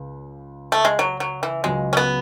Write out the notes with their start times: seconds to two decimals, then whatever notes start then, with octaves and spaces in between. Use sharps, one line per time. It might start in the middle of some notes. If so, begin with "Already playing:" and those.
Already playing: C#2 C#3
0.72 A3
0.85 G#3
0.99 F#3
1.20 F#3
1.43 E3
1.64 C#2 C#3 F#3 G#3
1.93 C#4
1.97 B3